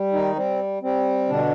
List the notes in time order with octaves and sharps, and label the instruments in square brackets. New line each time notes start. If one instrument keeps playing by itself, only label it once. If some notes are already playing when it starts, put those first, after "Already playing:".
Already playing: [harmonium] G3
D#3 D#4
G3 C4
G3 C4
B2 D3 D4